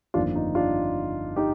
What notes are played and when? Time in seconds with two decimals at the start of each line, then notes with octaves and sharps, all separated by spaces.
0.14 G1 F2 D#3 A#3 D4 F4
0.36 D#4
0.55 D4 F4
1.36 D#4 G4